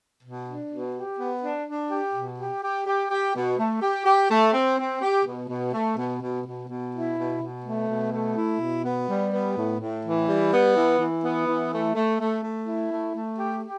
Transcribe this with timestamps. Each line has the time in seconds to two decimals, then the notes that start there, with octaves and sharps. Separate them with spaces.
0.23 B2
0.48 D4
0.71 B2
0.95 G4
1.19 B3
1.42 D4
1.67 D4
1.90 G4
2.14 B2
2.39 G4
2.62 G4
2.86 G4
3.10 G4
3.35 B2
3.58 A3
3.81 G4
4.05 G4
4.30 A3
4.53 C4
4.78 C4
5.02 G4
5.25 B2
5.49 B2
5.73 A3
5.97 B2
6.21 B2
6.45 B2
6.68 B2
6.93 E4
7.17 B2
7.41 B2
7.64 A3
7.89 B2
8.12 A3
8.36 E4
8.60 B2
8.84 B3
9.08 G3
9.32 B3
9.56 A2
9.80 A2
10.04 E3
10.27 G3
10.52 B3
10.75 E3
10.99 E3
11.23 B3
11.47 E3
11.71 A3
11.95 A3
12.19 A3
12.43 A3
12.66 E4
12.91 A3
13.15 A3
13.38 G4
13.62 G4